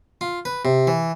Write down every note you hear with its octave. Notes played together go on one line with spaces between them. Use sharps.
F4
B4
C3
E3